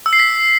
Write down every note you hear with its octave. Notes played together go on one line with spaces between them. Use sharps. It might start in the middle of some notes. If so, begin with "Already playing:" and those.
E6
C7
B6